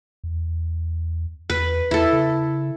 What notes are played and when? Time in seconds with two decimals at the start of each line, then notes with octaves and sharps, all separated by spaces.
0.24 E2
1.50 E2 B4
1.91 E2 E4 A4
2.13 C#3